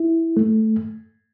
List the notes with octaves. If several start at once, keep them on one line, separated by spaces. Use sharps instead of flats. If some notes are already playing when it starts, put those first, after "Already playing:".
Already playing: E4
A3